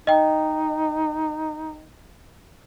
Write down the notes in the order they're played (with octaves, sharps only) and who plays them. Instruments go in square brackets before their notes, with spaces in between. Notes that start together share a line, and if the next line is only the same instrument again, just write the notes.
[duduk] D#4 [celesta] D#5 G5